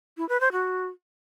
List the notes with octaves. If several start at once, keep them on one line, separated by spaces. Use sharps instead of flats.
E4
B4
C5
F#4